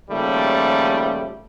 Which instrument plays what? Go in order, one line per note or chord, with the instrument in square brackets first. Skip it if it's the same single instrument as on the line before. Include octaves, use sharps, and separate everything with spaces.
[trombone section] D#2 C#3 F3 G3 A3